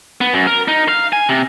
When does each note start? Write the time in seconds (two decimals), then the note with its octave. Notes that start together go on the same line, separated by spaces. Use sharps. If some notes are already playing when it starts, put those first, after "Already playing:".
0.21 B3
0.34 F#2
0.47 A#4
0.68 D#4
0.88 F5
1.13 G#5
1.29 C3